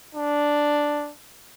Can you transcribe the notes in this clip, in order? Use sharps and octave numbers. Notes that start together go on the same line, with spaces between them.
D4